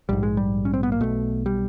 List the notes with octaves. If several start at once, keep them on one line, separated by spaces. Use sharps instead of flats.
A#1 G#2 G3
G#3
G3
C#4
C4
B3
A#3
B1 B2 A3
G3